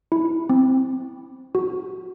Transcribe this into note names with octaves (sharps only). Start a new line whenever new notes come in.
E4
C4
F#4